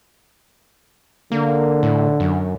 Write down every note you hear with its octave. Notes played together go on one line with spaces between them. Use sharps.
D3 A#3
A2
F#2